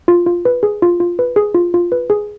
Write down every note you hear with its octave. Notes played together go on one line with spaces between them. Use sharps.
F4
F4
B4
G#4
F4
F4
B4
G#4
F4
F4
B4
G#4